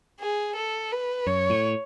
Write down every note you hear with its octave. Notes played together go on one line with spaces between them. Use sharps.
G#4
A4
B4
F#2 C#5
A2